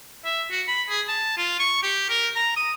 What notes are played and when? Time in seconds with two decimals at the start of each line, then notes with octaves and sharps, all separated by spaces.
0.25 E5
0.51 F#4
0.67 B5
0.89 G#4
1.08 A5
1.38 F4
1.60 C#6
1.83 G4
2.10 A#4
2.36 A#5
2.56 D#6